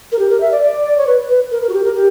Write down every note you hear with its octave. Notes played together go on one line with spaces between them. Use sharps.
A#4
G4
A#4
E5
D5
D5
C#5
B4
B4
A#4
A#4
F#4
G4
A#4
G4